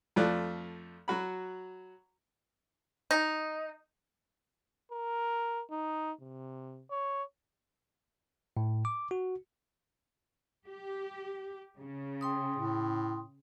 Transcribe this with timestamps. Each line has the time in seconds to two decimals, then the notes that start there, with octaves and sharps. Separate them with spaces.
0.16 F2 F3 A3 D5 F#6
1.08 F#3 F#4 B5
3.11 D#4
4.92 A#4
5.71 D#4
6.20 C3
6.90 C#5
8.57 A2
8.85 D6
9.11 F#4
10.67 G4
11.79 C#3
12.21 G5 C6 D#6
12.56 A2